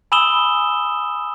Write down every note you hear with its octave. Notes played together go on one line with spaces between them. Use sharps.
G#5 B5 D#6 E6 E7 G7